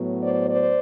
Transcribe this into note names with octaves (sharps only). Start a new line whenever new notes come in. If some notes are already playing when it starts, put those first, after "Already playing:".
Already playing: A2 F#3 B3
C5 D5
C5 D5